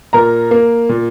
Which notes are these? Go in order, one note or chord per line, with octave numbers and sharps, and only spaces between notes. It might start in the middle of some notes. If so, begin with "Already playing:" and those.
A#2 A#4 A#5
A#3
A#2